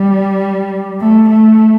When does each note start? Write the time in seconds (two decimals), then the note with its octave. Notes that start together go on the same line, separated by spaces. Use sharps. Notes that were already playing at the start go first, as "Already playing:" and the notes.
Already playing: G3
1.00 A3
1.30 A3